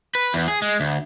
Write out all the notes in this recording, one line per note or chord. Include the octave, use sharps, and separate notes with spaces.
B4
E2
G#4
G#3
D2